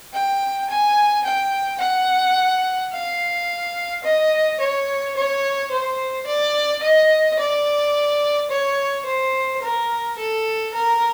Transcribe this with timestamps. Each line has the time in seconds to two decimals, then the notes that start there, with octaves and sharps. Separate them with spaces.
0.14 G5
0.70 G#5
1.25 G5
1.80 F#5
2.93 F5
4.04 D#5
4.60 C#5
5.16 C#5
5.72 C5
6.27 D5
6.83 D#5
7.39 D5
8.51 C#5
9.06 C5
9.62 A#4
10.18 A4
10.74 A#4